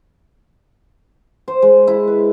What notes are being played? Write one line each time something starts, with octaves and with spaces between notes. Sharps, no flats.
C5
G#3
E4
B4